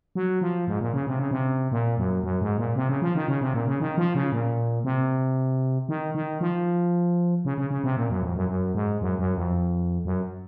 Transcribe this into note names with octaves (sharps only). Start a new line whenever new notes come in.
F#3
F3
G#2
A#2
C#3
C3
C#3
C3
A#2
F#2
F#2
G#2
A#2
C3
C#3
F3
D#3
C#3
C3
A#2
C#3
D#3
F3
C#3
A#2
C3
D#3
D#3
F3
C#3
C#3
C#3
C3
A#2
F#2
F2
F#2
F#2
G#2
F#2
F#2
F2
F#2